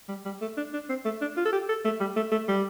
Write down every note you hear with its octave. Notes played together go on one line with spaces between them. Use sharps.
G3
G3
A3
D4
D4
C4
A3
D4
F4
A4
G4
A4
A3
G3
A3
A3
G3